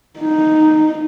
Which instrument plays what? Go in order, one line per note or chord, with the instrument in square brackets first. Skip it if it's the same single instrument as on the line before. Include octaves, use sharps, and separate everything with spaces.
[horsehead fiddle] D#4